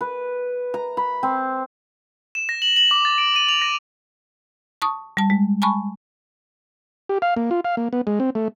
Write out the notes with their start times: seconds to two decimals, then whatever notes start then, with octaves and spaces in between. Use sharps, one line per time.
0.01 B4
0.74 A#5
0.97 B5
1.23 C4
2.35 E7
2.49 A#6
2.62 F#7
2.76 F#7
2.91 D6
3.05 A6
3.18 D7
3.36 D#7
3.49 F7
3.62 A#6
4.82 A5 C#6 D#6
5.17 G3 A5
5.30 G#3
5.62 G#5 A5 B5 C#6
7.09 G4
7.22 F5
7.37 A#3
7.51 F4
7.65 F5
7.77 A#3
7.93 B3
8.07 G#3
8.20 C4
8.35 A3